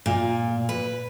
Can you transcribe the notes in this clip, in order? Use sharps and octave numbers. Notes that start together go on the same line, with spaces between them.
A#2
B4